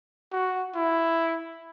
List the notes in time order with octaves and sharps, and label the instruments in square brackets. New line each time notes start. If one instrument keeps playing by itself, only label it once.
[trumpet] F#4
E4